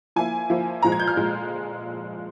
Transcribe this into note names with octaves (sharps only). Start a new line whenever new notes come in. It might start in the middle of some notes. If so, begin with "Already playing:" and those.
F3 A#3 E4 G#5
F3 A#3 E4
A#2 F3 G#3 A#5
G#6
G6
F6
A#2 F3 G#3